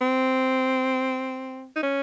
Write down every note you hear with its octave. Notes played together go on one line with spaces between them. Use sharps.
C4
D#4
C#4